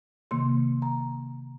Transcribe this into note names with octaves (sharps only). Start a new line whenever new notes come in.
C3 D#3 A#3 C6
A#5